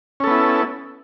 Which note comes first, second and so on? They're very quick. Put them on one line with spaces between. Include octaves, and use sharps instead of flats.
C#4 A4 B3 E4